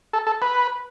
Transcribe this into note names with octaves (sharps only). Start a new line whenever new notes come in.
A4
A4
B4